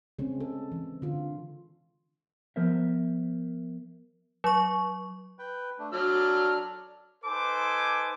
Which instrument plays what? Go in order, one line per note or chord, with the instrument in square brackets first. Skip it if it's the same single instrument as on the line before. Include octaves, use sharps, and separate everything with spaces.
[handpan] C#3 G#3 C4 C#4
A4
E3
D3 F4
[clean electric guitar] F3 B3 A#4 C5 E5
[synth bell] F#3 C#6
[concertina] B4 G5
A3 D4
[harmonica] F#3 F6 [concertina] D4 A4 D5
[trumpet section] D#4 A4 B4 C5 G#5 D6